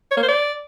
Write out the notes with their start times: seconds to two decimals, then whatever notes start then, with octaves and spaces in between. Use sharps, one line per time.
0.11 C#5
0.17 A#3
0.23 C5
0.28 D5